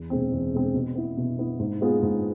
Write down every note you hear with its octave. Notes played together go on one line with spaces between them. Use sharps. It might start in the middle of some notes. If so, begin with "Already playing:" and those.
Already playing: E2
B2 G#3 C4
E2
B2 G#3 C4
B2
B3 E4
B2
B3 E4
G#2
G#3 B3 F4 G#4
G#2